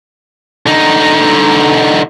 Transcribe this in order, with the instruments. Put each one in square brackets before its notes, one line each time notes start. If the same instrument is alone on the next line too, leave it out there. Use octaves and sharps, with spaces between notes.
[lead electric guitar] D3 D#4